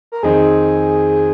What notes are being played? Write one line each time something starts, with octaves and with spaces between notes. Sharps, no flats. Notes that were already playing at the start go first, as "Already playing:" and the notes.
A#4
F2 D#3 C4 D#4 G#4